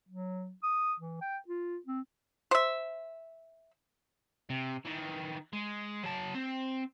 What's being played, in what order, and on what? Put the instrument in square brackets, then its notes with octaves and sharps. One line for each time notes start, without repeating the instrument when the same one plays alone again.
[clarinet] F#3
D#6
E3
G5
F4
C4
[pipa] C5 E5
[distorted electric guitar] C3
D#3 E3
G#3
F#3 A5
C4